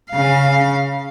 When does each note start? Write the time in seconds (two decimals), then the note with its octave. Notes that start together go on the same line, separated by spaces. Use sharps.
0.11 C#3 F5